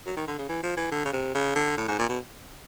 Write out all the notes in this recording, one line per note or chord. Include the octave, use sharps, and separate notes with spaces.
F#3
D#3
D3
C#3
E3
F3
E3
D3
C#3
C3
C#3
D3
A2
G#2
A#2
B2